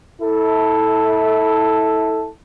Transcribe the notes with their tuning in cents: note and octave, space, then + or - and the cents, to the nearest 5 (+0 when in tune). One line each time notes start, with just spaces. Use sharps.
E4 -30 A4 +0